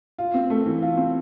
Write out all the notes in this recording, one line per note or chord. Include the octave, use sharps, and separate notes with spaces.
F4
C4
A3
E3
F4
C4